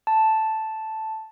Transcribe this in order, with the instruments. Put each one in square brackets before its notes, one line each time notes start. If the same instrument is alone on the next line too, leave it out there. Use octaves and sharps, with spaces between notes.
[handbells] A5